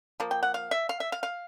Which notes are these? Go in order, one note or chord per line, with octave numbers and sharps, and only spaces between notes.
F3 A#3
G5
F#5
F5
E5
F5
E5
F5
F5